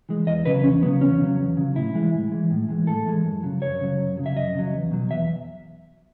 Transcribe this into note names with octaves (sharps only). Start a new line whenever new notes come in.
E3 G#3
E2 D#5
C#3 F#3 B4
E2 C#4
C#3 F#3 B3
E2 C#4
C#3 F#3
E2
C#3 F#3
A2 E4
E3 G#3
A2
E3 G#3
A2
E3 G#3
A2 A4
E3 G#3
F#2
C#3 F#3
F#2 C#5
C#3 F#3
F#2
C#3 F#3
E5
F#2 D#5
C#3 F#3
E2
B2 F#3
E2 E5